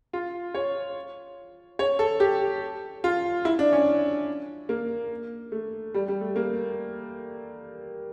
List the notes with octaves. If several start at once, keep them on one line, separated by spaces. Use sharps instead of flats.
F4
C#5
C#5
A4
G4
F4
E4
D4
C#4
A#3
A3
G3
G3
A3
A#3